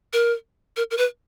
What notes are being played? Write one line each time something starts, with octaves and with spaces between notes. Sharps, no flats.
A#4
A#4
A#4
B4